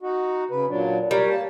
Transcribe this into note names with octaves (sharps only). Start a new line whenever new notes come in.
D#4 F#4
C#3 B4
A#2 F#3 D4
G3 A#4 C#5
A#3 A5